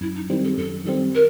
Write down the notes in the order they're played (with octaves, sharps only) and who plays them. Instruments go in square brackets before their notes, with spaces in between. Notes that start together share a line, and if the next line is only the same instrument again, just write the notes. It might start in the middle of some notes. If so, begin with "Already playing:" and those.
[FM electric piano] F#2 [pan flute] E4
[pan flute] D#4
[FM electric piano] D#3 G3 C4 [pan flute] E4
[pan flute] A4
[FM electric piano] F#2 [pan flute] A4
[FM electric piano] D#3 G3 C4 [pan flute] A4
[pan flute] A#4